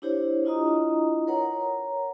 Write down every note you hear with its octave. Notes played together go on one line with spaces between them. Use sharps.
D4 E4 G4 C5 C#5
D4 E4 F4 D#5 A#5 D#6
A#4 B4 C#5 F#5 A#5